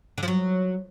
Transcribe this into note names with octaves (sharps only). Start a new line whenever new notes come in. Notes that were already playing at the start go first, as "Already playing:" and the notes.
D3
F3
F#3